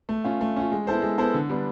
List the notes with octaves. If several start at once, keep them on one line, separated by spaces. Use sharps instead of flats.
A3
C#4 F4
A3
C#4 F4
G#3
B3 E4 A4 C5
G#3
B3 E4 A4 C5
D3
G3 B3 D4